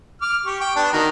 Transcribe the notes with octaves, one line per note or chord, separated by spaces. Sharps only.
D6 F6
G4 C#6
G5
B3 D4 A5
D#3 F#4 A#5